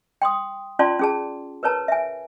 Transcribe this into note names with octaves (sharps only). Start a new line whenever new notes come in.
G5 C6 D#6
C#4 F4 D5 A5 C6
C#4 G#4 A5
A#4 B4 C#5 A5 A#5
E5 G#5